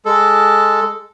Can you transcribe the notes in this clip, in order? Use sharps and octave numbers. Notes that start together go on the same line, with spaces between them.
G#3 A4